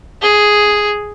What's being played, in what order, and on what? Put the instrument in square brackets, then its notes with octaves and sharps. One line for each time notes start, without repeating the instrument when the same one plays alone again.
[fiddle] G#4